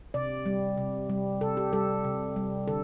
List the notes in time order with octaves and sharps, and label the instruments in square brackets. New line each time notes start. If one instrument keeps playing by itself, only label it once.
[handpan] C3 D5
G3
C3
G3
C3 A4
G4
G3 A4
C3
G3
D3 A4